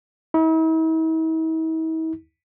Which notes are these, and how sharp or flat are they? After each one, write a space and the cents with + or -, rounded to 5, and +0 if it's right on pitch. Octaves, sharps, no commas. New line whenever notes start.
E4 -45